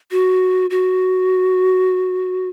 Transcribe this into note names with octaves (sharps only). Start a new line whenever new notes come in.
F#4
F#4